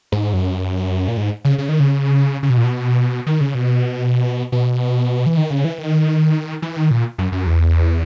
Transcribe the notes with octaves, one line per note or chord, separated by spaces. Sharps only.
G#2
F#2
A#2
G#2
C#3
C#3
D#3
C#3
C#3
B2
A#2
B2
D#3
C#3
B2
B2
E3
D#3
C#3
E3
D#3
E3
D#3
A#2
F#2
F#2
E2